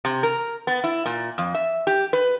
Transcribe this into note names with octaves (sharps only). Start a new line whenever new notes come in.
C3
A#4
B3
E4
A#2
F2
E5
G4
B4